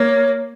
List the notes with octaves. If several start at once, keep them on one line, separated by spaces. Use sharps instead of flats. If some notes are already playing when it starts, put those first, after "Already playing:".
Already playing: A#3 C#5